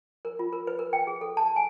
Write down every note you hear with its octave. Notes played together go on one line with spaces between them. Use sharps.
A#4
F4
A#4
B4
A#4
G5
G#4
A4
A5
G#5